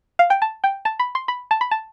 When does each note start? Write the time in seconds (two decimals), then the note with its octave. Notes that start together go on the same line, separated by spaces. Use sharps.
0.19 F5
0.30 G5
0.42 A5
0.64 G5
0.85 A5
0.99 B5
1.15 C6
1.28 B5
1.51 A5
1.61 B5
1.71 A5